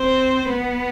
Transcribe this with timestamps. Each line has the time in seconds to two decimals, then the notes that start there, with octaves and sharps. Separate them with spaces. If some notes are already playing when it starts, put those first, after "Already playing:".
Already playing: C4 C5
0.50 B3 B4